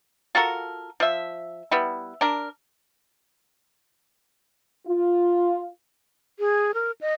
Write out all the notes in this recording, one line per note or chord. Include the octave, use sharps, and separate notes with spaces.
F4 F#4 A4 A#4
F3 E5
G3 B3 E4
D4 A#4
F4
G#4
A#4
D#5